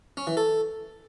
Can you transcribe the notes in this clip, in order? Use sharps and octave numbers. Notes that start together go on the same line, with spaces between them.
C#4
E3
A4